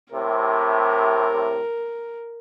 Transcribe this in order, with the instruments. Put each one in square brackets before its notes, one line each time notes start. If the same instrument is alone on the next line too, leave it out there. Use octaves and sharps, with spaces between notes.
[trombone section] A2 C3 [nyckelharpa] A#4